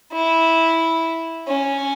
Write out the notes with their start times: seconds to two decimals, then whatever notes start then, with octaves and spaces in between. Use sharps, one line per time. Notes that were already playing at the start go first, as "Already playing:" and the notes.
0.13 E4
1.48 C#4